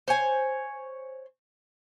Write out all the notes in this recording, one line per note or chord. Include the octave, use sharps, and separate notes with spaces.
C5 C#5 G#5